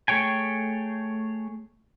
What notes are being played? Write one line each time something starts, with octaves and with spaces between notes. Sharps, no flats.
A3 G#4 C#5 G5 G#5